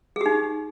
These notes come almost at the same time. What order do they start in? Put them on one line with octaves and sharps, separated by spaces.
G#4 G4 D#4